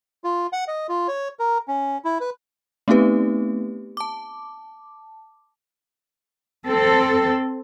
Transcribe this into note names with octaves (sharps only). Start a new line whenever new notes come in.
F4
F#5
D#5
F4
C#5
A#4
C#4
E4
B4
A3 B3 C4 D#4 G4 B4
A5 D6
C4 A4